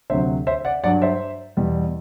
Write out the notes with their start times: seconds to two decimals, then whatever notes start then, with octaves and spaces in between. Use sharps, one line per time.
0.10 D2 C3 F#3 C5 E5
0.47 C5 E5
0.65 D5 F#5
0.84 G2 F#3 D5 F#5
1.02 C5 E5
1.57 E2 B2 G3